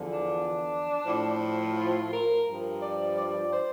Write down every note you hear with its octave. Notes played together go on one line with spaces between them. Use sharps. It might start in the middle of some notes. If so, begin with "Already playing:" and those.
Already playing: E2 D3 F3
D4
A2 F3
F4
A#4
G2 F3
D5
D5
C5